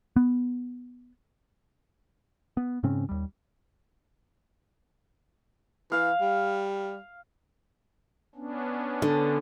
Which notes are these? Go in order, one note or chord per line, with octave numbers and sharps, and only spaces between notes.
B3
B3
G#2 C#3 C4 C#4
D#2 G3
E3 F5
G3
B3 C#4 D4
D3